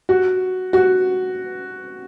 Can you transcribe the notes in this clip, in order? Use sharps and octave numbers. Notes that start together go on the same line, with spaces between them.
F#4
F#4